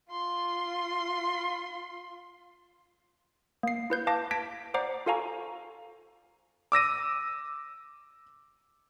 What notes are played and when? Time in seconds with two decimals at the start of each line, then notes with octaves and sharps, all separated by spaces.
0.11 F4 C6
3.63 A#3 C7
3.90 E4 B4 G6
4.07 F5 A5 D6 A#6
4.31 A5 G#6 A#6 B6 D7
4.74 C5 D5 F#5 A#5 D6 C7
5.06 F4 A4 F5 G#5 A#5 C#6
6.72 D6 E6 A#6 D#7